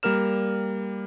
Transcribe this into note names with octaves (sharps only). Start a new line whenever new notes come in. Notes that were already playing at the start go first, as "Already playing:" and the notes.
G3 A#3 A#4 F6 E7